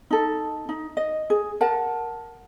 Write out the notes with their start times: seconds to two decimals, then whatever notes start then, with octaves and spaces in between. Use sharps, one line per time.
0.11 D#4 A4
0.69 D#4
0.97 D#5
1.30 G#4
1.61 A#4 F#5 A5